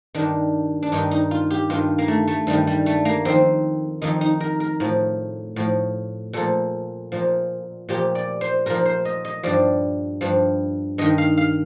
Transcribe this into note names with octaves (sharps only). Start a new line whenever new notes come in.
G2 D#3 D4
D4
G2 D#3 D#4
D#4
F4
G4
G2 D#3 F4
A#3
A3
A3
G2 D#3 G3
G3
A3
A#3
F2 D#3 C4
F2 D#3 D#4
D#4
A#4
A#4
A2 F3
A2 F3
A#2 F3 A4
A#2 F3
A#2 F3 G4
D5
C5
A#2 F3 A#4
C5
D#5
D#5
G2 F3 D5
G2 F3
G2 D#3 D#5
F5
F5